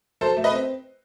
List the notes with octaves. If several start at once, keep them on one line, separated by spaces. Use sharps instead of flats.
F#3 A4 C5
A3
B4 D#5
C4